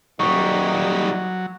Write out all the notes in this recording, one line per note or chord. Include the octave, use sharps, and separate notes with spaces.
D#1 F#3 G3 D#4 C#6